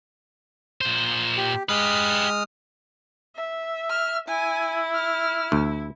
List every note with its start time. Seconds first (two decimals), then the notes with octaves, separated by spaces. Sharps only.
0.81 A#2 C5
1.37 G4
1.69 G#3 G4 B4 D#6 F6
3.36 E5
3.90 F6
4.28 E4 G#5
4.94 F6
5.52 D2